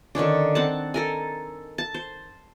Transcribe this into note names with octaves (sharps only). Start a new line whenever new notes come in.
D3 D#3 C#4 D4
C4 F#5 A5
A4 A#4 G#5
A5
C5